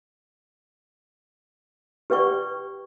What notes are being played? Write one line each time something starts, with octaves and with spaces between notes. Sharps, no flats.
G4 B4 D5 G5 C#6